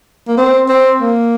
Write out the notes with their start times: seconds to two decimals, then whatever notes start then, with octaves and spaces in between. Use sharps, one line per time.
0.28 A#3
0.37 C4
0.69 C4
1.01 A#3